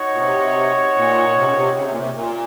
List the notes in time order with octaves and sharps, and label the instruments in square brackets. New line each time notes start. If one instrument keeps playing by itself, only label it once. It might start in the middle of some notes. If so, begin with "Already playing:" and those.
Already playing: [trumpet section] D#4 F#4 C#5
[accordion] A#2
C3
A#2
C3
C#3
C3
C#3
C3
A#2
C3
A#2